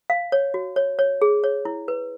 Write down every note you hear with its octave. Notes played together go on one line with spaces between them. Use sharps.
F5
C#5
F#4
C#5
C#5
G#4
C#5
E4
B4